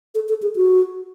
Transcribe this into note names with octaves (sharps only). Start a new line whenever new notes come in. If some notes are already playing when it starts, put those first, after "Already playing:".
A4
A4
G#4
F#4